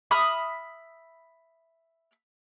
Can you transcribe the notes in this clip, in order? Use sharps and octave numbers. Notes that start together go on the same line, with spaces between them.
E5 B5 D#6 F6